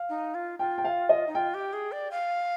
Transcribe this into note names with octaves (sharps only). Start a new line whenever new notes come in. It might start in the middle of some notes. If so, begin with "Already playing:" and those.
Already playing: F5
D#4
F4
F4 G5
G5
F5
D#5
D#4
F4 G5
G4
G#4
D5
F5